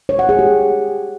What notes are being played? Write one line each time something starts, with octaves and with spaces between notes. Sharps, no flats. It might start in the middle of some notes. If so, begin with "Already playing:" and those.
C#5
F#5
G#4
G4